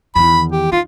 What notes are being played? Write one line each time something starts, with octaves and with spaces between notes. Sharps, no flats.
E2 D#3 B5
G4
D#4 F4